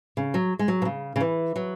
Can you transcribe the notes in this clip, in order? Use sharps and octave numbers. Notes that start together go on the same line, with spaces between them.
C#3
F#3
G#3
F#3
B2
C#3
C#3
E3
F#3